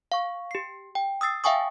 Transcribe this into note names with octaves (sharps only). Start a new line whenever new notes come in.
F5 C#6
G4 C7
G5
D#6 E6 A6 C7
E5 F5 G5 G#5 C#6 D#6